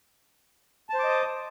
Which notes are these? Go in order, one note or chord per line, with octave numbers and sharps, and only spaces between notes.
C5 D#5 A5 D6 D#6